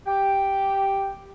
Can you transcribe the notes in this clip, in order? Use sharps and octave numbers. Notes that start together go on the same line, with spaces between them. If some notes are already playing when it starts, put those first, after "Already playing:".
G4 G5